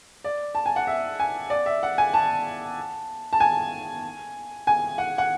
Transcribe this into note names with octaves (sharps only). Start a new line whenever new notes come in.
D5
A5
G#5
F#5
E5
G#5
D5
E5
F#5
G#5
A5
A5
G#5
G#5
F#5
F#5